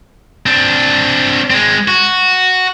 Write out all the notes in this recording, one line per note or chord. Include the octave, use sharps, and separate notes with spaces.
C4 D4
G#3 C4
F#4